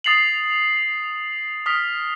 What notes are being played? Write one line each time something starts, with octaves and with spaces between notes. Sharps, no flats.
D#6 A6 C7 F7 F#7
D#6 F6 B6